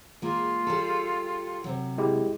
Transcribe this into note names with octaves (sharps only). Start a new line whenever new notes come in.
G#3 A#3 F4
G3 G#4 A4
C3 F#3
G#3 E4 G4